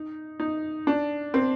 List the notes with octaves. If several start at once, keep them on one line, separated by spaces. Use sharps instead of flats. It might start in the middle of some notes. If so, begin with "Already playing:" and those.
Already playing: D#4
D#4
D4
C4